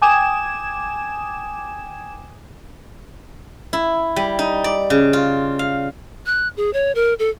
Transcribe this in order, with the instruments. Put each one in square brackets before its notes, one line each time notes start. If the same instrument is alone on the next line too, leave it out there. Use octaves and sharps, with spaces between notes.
[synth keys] G5 G#5 D6 D#6 G#6 E7
[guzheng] E4
G3
D#4
D5
C#3
F4
F5
[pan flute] F#6
G#4
C#5
A#4
A4